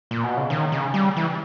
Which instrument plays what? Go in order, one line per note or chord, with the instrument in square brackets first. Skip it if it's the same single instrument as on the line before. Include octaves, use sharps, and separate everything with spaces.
[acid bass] A#2
B2
C#3
D#3
C#3
G3
E3